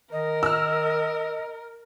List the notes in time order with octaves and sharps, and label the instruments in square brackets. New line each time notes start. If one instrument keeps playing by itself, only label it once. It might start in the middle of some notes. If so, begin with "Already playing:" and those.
[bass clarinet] D#3 [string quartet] A#4 [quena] D#5
[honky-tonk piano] E6 F6